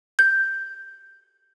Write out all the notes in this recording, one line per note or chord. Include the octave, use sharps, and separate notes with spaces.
G6